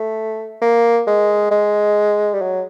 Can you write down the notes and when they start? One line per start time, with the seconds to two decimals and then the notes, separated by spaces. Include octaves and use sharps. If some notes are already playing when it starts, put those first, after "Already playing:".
Already playing: A3
0.61 A#3
1.07 G#3
1.51 G#3
2.34 G3
2.41 F#3